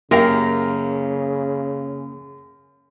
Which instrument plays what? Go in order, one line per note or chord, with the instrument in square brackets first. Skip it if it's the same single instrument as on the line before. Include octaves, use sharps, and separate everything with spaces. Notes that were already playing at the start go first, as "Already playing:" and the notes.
[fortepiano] F#2 G4 F5 [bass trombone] C#3 [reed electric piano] A#3 [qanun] A#4